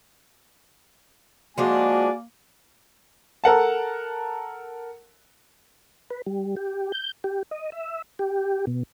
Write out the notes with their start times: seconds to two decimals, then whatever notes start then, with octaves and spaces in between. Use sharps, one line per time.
1.58 F3 G#3 A#3 D4 F#4 D5 G#5
3.44 A4 A#4 F#5 A5
6.10 B4
6.26 G3
6.57 G4
6.92 G6
7.24 G4
7.51 D#5
7.72 E5
8.19 G4
8.67 B2